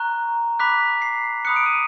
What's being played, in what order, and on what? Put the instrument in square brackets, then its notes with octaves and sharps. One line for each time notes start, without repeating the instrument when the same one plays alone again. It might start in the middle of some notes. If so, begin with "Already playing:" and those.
Already playing: [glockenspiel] A#5 C#6 F#6
B5 D6 F#6 B6
C7
B5 D#6 F#6 C#7
D7
D#7